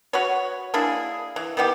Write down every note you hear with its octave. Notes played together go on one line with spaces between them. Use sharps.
F#4 B4 C#5
A#3 D4 E4 G#4
E3
D#3 E3 B3 G4